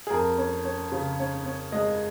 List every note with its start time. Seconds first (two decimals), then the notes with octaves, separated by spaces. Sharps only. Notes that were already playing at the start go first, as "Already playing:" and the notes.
0.07 G#4
0.10 F2 A#4
0.38 C#4
0.65 C#4
0.92 C#3
1.19 C#4
1.46 C#4
1.72 G#3 D#5